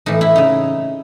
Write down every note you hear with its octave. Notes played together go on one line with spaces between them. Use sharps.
A2 E3 D#4
E4
C#3 D#4